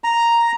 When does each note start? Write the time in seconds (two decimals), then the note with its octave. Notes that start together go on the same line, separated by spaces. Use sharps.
0.04 A#5